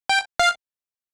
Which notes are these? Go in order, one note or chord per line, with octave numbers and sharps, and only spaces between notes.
G5
F5